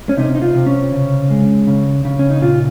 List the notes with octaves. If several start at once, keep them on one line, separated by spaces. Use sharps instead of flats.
C#4
C3 D#4
D#4
F4
C3
C#4
C#3
G#3
C#3
C#3
C#4
D#4
A#2 F4